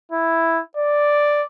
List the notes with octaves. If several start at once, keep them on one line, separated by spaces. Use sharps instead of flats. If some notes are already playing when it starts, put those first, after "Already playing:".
E4
D5